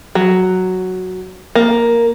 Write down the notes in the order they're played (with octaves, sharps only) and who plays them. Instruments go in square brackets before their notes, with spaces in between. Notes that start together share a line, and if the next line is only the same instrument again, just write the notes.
[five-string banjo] F#3
A#3